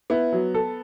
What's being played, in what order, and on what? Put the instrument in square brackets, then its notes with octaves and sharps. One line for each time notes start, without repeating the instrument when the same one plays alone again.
[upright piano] B3 [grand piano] E4
[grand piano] F#3
A4